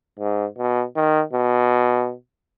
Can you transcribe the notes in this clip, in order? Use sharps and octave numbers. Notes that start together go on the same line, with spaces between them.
G#2
B2
D#3
B2